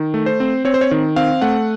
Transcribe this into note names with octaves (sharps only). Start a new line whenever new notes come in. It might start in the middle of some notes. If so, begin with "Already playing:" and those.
Already playing: D#3
A3
C5
C4
C4 C#5
C5
C#5
D#3
C4 F5
A3 F#5